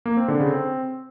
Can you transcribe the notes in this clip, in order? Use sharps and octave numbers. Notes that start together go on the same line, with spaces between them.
A#3
C4
D3
C#3
C4